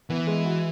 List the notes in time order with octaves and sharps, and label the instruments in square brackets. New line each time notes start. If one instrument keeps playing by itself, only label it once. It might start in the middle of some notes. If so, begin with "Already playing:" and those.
[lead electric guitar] E3 [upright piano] B3
[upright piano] G#3
F#4